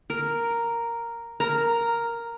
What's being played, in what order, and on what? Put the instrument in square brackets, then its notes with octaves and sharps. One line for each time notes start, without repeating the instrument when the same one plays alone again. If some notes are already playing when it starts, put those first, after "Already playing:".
[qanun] A#4
[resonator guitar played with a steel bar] A#4 [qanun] A#5